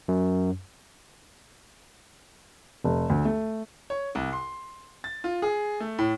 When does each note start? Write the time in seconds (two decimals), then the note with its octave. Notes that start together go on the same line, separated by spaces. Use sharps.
0.08 F#2
2.84 F1
3.10 D2
3.25 A3
3.90 C#5
4.15 C2
4.33 C6
5.04 A6
5.24 F4
5.42 G#4
5.80 A3
5.99 A2